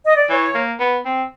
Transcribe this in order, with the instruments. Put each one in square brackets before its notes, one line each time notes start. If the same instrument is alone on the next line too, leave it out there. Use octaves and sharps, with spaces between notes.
[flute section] D#5
D5
[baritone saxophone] E3 [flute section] C#5
[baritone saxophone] A#3
B3
C4